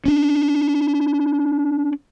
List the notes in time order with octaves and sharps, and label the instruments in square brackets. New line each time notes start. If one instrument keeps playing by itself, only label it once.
[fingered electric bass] C#4 D4